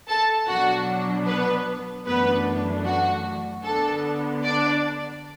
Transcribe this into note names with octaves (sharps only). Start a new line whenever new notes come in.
A4 A5
B2 F#3 D4 F#4 F#5
B3 B4
F#2 E3 A3 B3 D4 B4
F#4
D3 B3 D4 A4
D4 D5